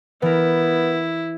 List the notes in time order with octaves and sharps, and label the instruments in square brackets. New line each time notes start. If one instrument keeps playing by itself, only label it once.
[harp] E3 A#4 [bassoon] B3 [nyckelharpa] E4